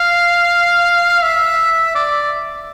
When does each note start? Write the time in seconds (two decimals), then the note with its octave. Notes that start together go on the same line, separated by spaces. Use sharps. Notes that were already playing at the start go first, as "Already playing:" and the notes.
Already playing: F5
1.22 E5
1.95 D5